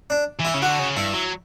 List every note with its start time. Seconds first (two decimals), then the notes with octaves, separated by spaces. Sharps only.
0.10 D4
0.39 E3
0.45 E4
0.54 C#3
0.62 D3 F#4
0.79 C#3
0.96 G2 E4
1.13 F#3